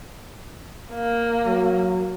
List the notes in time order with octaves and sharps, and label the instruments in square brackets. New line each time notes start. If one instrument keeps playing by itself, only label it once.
[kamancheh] A#3
[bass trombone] F#3